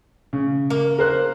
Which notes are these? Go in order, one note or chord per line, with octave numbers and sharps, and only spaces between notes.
C#3
A#3
A#4 C5 F#6